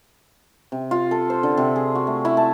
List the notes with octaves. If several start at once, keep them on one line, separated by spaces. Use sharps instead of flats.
C3
F4
A4
C5
D3
C3
G#4
F#4
A3
E4
A5